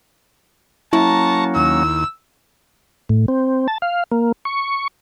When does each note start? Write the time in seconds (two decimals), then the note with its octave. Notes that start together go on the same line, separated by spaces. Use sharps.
0.93 F#3 A#3 C#4 E4 A5 A#5 C#6
1.55 D#2 E6
3.09 A2
3.28 C4
3.68 A5
3.82 F5
4.12 A#3
4.45 C#6